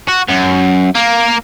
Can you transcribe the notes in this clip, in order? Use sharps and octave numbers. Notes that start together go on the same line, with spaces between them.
F#4
F#2
A#3